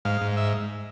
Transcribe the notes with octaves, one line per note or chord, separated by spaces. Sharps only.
G#2 F5
G#2
E5